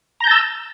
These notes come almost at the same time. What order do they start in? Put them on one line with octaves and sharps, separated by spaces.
A#5 G6 A5 E6